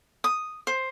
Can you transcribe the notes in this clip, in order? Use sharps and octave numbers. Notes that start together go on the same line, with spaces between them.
D#6
C5